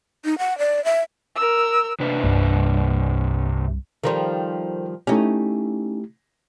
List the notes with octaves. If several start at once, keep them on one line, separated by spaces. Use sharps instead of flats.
D#4
F#5
D5
E5
A#4 E6
C3 D4 B4
C2 G2 G3
D#3 F3 G3 A4 A#4 C5
A3 C#4 D#4 E4 G4